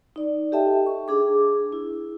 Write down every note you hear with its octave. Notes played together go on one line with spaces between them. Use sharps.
D#4 D5
G4 A4 D#5 E5 G5 A5
C#6
D4 G#4 D6
E4